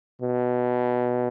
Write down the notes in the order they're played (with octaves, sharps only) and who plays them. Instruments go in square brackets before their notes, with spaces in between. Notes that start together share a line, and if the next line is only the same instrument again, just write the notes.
[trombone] B2